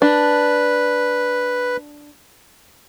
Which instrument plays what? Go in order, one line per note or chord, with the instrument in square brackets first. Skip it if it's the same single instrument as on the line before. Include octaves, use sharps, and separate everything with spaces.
[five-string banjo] D4 [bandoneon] B4